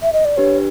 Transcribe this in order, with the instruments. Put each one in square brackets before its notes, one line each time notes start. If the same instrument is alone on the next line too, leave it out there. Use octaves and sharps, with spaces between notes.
[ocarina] E5
D#5
D5
[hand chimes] D4 G4 B4 [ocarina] C#5